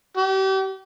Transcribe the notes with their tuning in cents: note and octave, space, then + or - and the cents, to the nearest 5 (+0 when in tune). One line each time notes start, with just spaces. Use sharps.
G4 -35